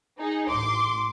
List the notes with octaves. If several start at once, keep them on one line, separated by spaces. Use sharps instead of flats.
D#4 G#4
A1 C6 D6